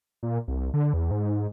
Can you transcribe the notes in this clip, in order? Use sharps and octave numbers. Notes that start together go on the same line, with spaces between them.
A#2
C2
D3
E2
G#2